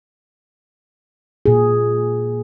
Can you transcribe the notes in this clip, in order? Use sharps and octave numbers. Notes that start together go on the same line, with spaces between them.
A#2 G#4